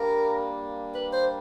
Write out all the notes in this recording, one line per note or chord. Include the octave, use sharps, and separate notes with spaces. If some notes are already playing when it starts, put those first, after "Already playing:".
Already playing: G3 A#3 D4 A#4
B4
C5